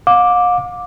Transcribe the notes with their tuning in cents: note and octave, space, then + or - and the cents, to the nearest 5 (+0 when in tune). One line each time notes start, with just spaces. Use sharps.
F5 +40 D6 +0